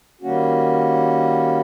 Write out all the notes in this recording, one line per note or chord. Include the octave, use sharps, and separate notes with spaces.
D#3 G3 A#3 C#4 F#4